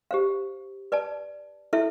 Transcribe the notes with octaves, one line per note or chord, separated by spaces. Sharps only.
G4 C5 F5
B4 D5 A5
E4 A4 E5